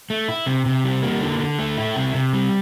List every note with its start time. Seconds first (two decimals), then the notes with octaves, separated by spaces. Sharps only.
0.10 A3
0.28 E4
0.46 C3
0.66 C3
0.84 G3
1.03 A#3
1.21 D3
1.39 D3
1.59 A3
1.77 E4
1.96 C3
2.15 C3
2.33 G3